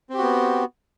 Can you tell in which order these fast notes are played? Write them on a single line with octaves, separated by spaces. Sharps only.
C4 G4 F#4 B3